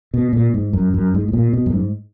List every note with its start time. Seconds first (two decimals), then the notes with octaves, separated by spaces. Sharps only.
0.14 B2
0.33 A#2
0.54 G#2
0.73 F#2
0.94 F#2
1.14 G#2
1.28 G#2
1.33 A#2
1.53 B2
1.66 F#2
1.73 G#2